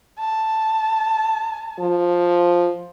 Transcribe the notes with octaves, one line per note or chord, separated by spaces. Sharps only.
A5
F3